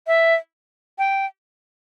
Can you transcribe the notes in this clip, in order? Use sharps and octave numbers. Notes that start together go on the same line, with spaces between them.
E5
G5